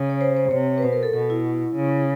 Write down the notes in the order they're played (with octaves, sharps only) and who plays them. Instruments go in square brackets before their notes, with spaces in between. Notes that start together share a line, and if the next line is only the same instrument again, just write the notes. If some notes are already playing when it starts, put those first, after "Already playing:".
Already playing: [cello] C#3
[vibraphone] C#5
C5
C5
[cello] C3 [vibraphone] C#5
[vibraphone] B4
[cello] B2 [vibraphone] C5
[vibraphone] A#4
A4
[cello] B2 [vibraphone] A4
[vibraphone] E4
[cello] C#3